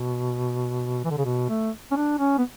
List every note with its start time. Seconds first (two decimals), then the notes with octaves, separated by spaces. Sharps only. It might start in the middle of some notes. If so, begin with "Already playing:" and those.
Already playing: B2
1.04 E3
1.11 D3
1.17 C#3
1.25 B2
1.49 A3
1.91 C#4
1.96 D4
2.19 C#4
2.38 B3